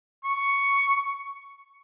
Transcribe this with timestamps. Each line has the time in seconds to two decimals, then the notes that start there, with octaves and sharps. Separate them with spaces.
0.24 C#6